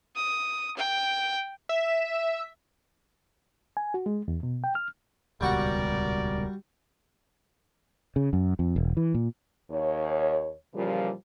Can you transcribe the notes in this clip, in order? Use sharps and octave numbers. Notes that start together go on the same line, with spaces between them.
D#6
G5
E5
G#5
F#4
G#3
E2
B2
G5
F6
D#1 C#2 B2 G3 F#4 A#4 D5 F#5
C#3
F#2
F2
E1
E3
A#2
D#2 C#5
A#2 C#3 E3 F3 G3